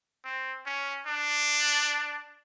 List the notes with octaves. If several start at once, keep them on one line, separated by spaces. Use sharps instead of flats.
C4
C#4
D4